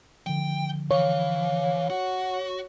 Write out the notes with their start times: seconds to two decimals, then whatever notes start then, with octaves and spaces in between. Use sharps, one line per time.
0.27 D3 F3 G5
0.91 E3 C#5 F5
1.90 F#4 F#5